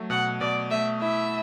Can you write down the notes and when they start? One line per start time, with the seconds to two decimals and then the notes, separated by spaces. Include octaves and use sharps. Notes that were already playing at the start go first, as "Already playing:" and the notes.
Already playing: F#3 A3
0.10 B2 F#5
0.41 B2 D5
0.71 A3 E5
1.01 E4 E5